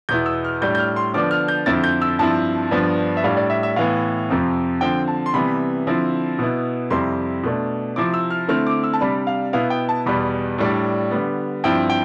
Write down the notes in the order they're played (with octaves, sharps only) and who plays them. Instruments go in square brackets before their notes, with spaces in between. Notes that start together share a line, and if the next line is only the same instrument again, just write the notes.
[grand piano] E2 B2 B3 E4 G6
E6
F6
A2 G3 D4 G6
G6
F6
C6
D3 F3 B3 D4 D6
F6
G6
F2 D3 F3 C4 E4 A6
G6
E6
G2 F3 C4 E4 A5
G2 F3 B3 D4
E5
A2 G3 D4 F5
D5
E5
E5
A2 E3 B3 F5
F2 C3 F3 C4
D3 F3 C4 G5
A5
C6
C3 E3 G3 B3 B5
D3 F3 C4 E4
B2 B3 E4
F2 C3 G3 C4 E4 C6
B2 A3 D4
C3 F3 C4 E4 D6
E6
F6
D3 A3 C4 E4 F6
D6
E6
A5
C3 G3 D4 B5
F5
B2 B3 E4 F5
G5
A5
E2 B2 G3 B5
A2 G3 D4
D3 G3 B3
G2 F3 C4 E4 G5
G5